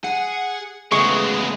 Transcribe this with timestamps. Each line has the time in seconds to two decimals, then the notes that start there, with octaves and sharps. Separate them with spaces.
0.04 G#4 F#5
0.92 C#3 G#3 A3 B3 G#4 C#6